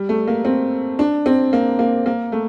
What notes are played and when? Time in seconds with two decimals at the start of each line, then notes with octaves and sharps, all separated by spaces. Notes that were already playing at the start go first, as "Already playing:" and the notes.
Already playing: G3
0.09 A3
0.28 A#3
0.45 C4
0.99 D4
1.26 C4
1.53 A#3
1.79 A#3
2.06 A#3
2.32 A3